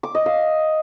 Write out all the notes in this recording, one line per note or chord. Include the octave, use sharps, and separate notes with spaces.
D6
D#5
F5